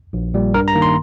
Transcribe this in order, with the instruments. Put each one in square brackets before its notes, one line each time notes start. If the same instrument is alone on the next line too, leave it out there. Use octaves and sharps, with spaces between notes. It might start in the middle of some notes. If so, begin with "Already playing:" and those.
[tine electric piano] A#1
A#2 G3
G2 A#4
A#5
D#3 A#3
C6